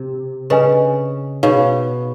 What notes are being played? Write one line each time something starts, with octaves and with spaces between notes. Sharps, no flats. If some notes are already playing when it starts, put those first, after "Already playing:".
Already playing: C3
C#3 B4 D#5 G#5
B2 D#4 G#4 C#5 F5